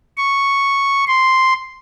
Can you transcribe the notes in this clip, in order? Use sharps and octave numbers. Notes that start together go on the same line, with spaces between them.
C#6
C6